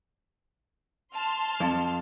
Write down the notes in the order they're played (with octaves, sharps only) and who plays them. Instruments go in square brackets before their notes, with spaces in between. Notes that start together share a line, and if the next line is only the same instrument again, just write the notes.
[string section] A5 C6 F6
[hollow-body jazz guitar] F2